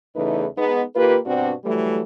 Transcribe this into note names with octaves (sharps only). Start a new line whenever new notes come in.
E2 C#3 E3 A3 D#4 B4
G#3 B3 D#4
D#3 A#3 F4 G4 B4
G2 B2 C4 D4 F#4
E3 F#3 G3 A3